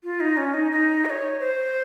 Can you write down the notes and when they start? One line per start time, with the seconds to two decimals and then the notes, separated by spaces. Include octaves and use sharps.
0.04 F4
0.20 D#4
0.37 C#4
0.54 D#4
0.72 D#4
1.05 D#5
1.10 C#5
1.40 C5